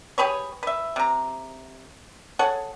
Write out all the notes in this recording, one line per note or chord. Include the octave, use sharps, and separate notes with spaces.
G4 G#4 B4 C#5
B4 E5
C3 A#5
G#4 A4 C#5 F#5